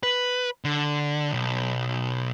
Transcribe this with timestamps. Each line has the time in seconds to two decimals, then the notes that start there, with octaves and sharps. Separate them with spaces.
0.03 B4
0.65 D3
1.32 B1